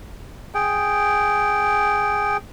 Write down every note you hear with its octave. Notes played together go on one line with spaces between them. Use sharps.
G#4 G5